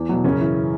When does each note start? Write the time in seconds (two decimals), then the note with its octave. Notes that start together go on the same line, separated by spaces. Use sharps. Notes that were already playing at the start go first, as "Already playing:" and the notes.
Already playing: E2
0.09 B2 F#3
0.24 F#2 C#3 C#4
0.40 E3